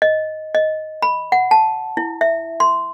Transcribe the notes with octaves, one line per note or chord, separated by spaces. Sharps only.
D#5
D#5
B5
F#5
A5
E4
E5
C6